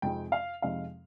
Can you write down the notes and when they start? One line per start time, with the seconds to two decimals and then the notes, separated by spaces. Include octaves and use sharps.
0.02 F2 C3 F3 G#3 D#4 G5
0.32 F5
0.62 F2 C3 F3 G#3 D#4 F5